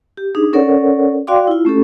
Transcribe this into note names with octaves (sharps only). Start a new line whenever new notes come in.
G4
D4 D#4 G#4
C#4 A4 A#4 C#5 D5 F#5
F#4 D5 F5 G5 C6 D6
E4 F4
A3 C#4 G4 A4